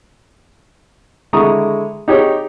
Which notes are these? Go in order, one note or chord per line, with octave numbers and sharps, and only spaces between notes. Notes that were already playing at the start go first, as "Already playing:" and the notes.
D3 G#3 E4 A#5 C#6 D#6
D#4 G4 G#4 C#5